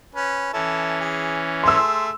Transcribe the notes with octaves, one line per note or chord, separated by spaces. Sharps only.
C#4 B4
E3 C#4 E4 A4
G#4
A3 G#4 C6 E6